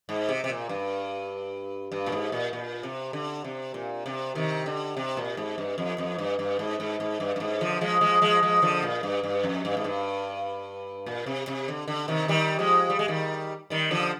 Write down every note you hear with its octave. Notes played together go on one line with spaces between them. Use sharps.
G#2
C3
C3
A#2
G2
G2
A#2
G#2
A#2
A#2
C3
D3
C3
A#2
C3
C3 D#3
D3
C3
A#2
G#2
G2
F2
F2
G2
G2
G#2
G#2
G#2
G2
G2
G#2
D3 F3
F3 G#3
F3 G#3
F3 G#3
F3 G#3
D3 F3
A#2
G2
G2
F2
G2
G#2
G2
A#2
C3
C3
D3
D3
C3 D#3
D#3 G3
F3 G#3
G3
G#3
D#3 G3
D#3 G3
D3 F3